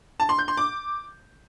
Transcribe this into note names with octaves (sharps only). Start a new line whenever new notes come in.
A5
C6
G6
C6
D6